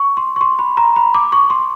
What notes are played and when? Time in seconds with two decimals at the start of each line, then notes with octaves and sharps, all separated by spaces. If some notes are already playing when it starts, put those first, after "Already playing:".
Already playing: C#6
0.17 C6
0.36 C#6
0.41 C6
0.59 B5
0.77 A#5
0.96 B5
1.14 D6
1.32 C#6
1.50 C6